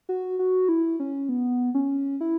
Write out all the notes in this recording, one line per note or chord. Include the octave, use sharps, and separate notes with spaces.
F#4
F#4
E4
C#4
B3
C#4
E4